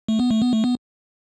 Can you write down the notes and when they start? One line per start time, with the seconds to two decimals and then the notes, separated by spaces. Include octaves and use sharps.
0.08 A3
0.19 B3
0.31 A3
0.42 B3
0.53 A3
0.64 B3